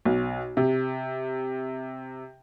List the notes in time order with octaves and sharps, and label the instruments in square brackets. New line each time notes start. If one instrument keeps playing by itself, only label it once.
[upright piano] B1
C3